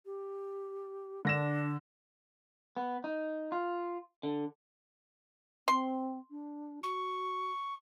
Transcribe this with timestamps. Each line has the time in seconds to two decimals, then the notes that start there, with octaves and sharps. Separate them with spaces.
0.05 G4
1.25 D3 D4 A#6 E7
2.77 B3
3.04 D#4
3.52 F4
4.23 D3
5.68 C4 C6
6.31 D4
6.83 F#4 C#6